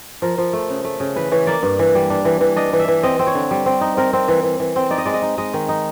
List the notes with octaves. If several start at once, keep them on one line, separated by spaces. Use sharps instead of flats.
F3 A#4
F3
A3
C#3
A3
C#3
E3 B4
E3 C#5
A#3 D5
G2
E3
G3
D4
E3
E3
D4 D#5
E3
E5
E3
C4 D#5
C4
C#5
D3
G3
C4
D#4
C4 A#4
C4
E3
E3
E3
C4
D#4 D5
D#5
G#3 D5
D#5
D#4
G#3 D#5
D#3
D#4